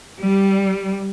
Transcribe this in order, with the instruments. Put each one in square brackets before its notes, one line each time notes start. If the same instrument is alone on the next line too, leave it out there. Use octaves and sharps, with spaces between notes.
[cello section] G3